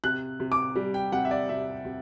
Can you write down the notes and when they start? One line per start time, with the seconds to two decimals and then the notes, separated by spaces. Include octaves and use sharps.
0.04 C3 F#6
0.40 C3
0.52 D6
0.76 G3
0.94 G5
1.12 C3 F#5
1.25 E5
1.31 D5
1.49 C3 E5
1.85 C3